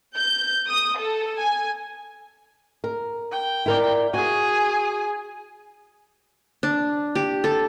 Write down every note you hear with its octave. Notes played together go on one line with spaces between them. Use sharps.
G6
D#6
A4
G#5
A#4
G5
E4 A#4 D5
F#4 G#4 G#5
D4
G4
A4